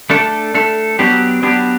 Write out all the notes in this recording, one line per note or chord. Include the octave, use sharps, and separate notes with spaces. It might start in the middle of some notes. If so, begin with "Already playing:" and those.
A3 D4 A4
A3 D4 A4
F#3 B3 D4 G4
F#3 B3 D4 G4